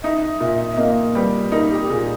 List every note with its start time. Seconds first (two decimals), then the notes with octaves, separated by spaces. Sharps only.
0.03 D#4 E5
0.40 A#2 E5
0.72 E5
0.77 A#3 D#5
1.15 G3 B4
1.52 D#4 A#4
1.71 G4
1.81 G4
1.89 A#2 G#4